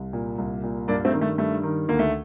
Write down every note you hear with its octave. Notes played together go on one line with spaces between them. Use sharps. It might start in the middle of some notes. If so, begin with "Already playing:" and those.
Already playing: C2
A#2
C2
A#2
G2 A#3 D4
A3 C4
D#3
A3
G2 A3
D#3
D2 A#3
A3